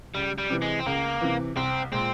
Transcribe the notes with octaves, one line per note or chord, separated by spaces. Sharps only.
C#2 G3
G3
C3 E3
G#3
C4
C#2 A#3
C3 E3
C2 C4
A#2 G#3 C4